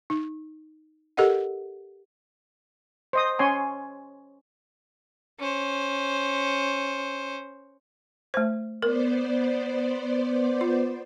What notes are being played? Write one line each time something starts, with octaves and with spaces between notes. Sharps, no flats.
D#4
G4 A4 A#4 D#5 F#5
C5 D#5 D#6
C#4 C#5 G#5 C6
C#4 C5
A3 C5
B3 A#4 C5 D5
F4